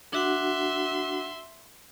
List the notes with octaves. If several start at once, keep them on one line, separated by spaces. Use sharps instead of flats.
D4 F#4 E5 F#5 C6